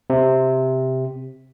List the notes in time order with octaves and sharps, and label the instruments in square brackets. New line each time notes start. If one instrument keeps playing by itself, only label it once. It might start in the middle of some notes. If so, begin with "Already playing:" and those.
[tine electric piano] C3